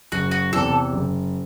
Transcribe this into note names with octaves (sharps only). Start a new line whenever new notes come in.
F#1 F#4
F#4
E2 C3 E3 A4
F#1